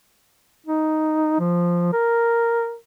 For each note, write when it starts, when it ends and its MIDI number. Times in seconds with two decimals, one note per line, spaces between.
0.67 1.37 63
1.40 1.90 53
1.93 2.75 70